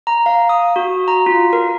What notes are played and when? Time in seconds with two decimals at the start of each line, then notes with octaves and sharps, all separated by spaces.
0.07 A#5
0.26 F5
0.49 D#6
0.76 F#4
1.08 A#5
1.26 F4
1.53 A#4